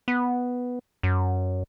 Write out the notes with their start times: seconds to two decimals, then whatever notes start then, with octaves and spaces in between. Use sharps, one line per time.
0.08 B3
1.03 F#2